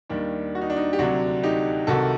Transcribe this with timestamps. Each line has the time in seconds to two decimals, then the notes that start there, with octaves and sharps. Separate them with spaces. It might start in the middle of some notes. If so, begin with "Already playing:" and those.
0.10 D#2 D#3 G3 D4
0.55 F#4
0.61 D#4
0.70 D4
0.76 D#4
0.93 G4
0.99 D2 C3 F#3 D4 F#4
1.43 D#4 G4
1.87 C2 C3 D#3 F#4 A4